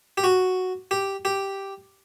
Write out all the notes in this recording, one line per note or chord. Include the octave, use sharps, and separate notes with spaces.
G4
F#4
G4
G4